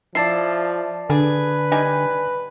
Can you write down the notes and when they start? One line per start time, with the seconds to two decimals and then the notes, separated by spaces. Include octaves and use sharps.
0.15 F3 E4 D5 A5 C7
1.10 D3 D4 G#4 B4
1.72 G3 D#4 G#5